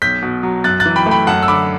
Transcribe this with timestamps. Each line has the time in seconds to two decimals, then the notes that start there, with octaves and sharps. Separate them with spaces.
0.02 B1 G6 B6
0.22 B2
0.43 F#3
0.64 F#2 F#6 A6
0.80 F#6 A6
0.85 E3
0.96 G5 B5
1.06 A3
1.11 G5 B5
1.27 F#2 F#5 A5
1.43 E6
1.48 D3 B5 D6